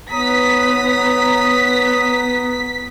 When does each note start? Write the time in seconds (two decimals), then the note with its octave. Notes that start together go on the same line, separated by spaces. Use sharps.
0.11 B3 C#4 D#4 A#5 D#6 B6